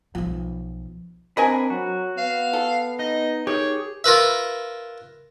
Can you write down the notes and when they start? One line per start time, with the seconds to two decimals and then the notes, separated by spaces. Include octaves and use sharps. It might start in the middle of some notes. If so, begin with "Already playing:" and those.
0.15 B1 F3
1.37 C4 D4 A#4 D#5 G#5 B5
1.70 F#3 F#4
2.18 B3 F5
2.53 A4
2.99 D#4 D#5
3.47 D#3 G4 G#4 C#5
4.04 F4 A#4 B4 E5